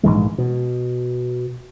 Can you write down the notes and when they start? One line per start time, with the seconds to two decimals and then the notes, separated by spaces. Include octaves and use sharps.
0.03 A#1 G#2 E3 G#3
0.38 B2